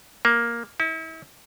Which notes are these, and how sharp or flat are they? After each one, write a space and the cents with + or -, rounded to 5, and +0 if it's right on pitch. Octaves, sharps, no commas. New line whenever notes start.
A#3 +5
E4 -40